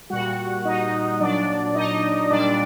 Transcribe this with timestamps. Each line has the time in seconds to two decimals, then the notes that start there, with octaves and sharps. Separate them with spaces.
0.10 A#2 G3 F#4 F#5
0.65 D#4 D#5
1.20 A#2 F#3 D4 D5
1.75 D#4 D#5
2.30 A#2 G3 D4 D5